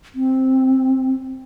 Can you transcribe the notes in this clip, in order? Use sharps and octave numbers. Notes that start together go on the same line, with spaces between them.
C4